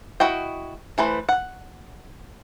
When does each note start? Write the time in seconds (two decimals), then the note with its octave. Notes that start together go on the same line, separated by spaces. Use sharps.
0.20 E4 F#4 D#5 G5
0.98 E3 A3 B4 C5
1.29 F#5